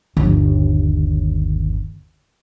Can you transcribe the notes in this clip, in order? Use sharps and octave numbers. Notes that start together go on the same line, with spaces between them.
G1 D#2